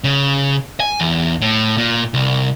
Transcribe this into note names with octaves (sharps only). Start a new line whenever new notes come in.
C#3
G#5
E2
A2
A#2
C2